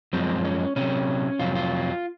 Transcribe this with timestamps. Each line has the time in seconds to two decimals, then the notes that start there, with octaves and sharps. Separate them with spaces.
0.13 F#2 F3 G#3 C4
0.45 C#4
0.76 C3 F#3 C#4
1.39 F2 C3 F#3 F4
1.55 F4